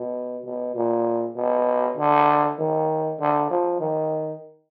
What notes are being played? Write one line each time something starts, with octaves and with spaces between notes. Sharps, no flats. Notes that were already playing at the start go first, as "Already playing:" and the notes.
Already playing: B2
B2
A#2
B2
D3
D#3
D3
F3
D#3